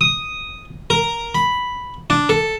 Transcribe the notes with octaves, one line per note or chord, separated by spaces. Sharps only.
D#6
A#4
B5
D4
A4